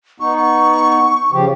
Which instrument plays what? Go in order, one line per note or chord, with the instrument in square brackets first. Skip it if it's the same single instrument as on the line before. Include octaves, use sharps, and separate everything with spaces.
[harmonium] B3 D#4 [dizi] C#6
[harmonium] C#3 F3 G4